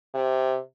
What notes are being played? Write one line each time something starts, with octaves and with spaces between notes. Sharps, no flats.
C3